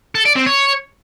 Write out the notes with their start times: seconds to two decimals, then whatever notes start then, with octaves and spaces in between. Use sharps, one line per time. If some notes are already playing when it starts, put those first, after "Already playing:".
0.15 A4
0.25 D5
0.36 C4
0.46 C#5